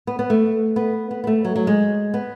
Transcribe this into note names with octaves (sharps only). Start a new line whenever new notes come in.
B3
B3
A3
B3
B3
B3
A3
F#3
F#3
G#3
B3